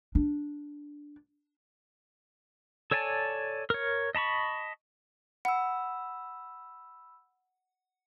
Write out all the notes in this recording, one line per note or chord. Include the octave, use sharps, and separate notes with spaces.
D4
A4 C#5 D5 G#5 A5
A#4 C#5
D#5 A5 B5 C#6
F#5 B5 E6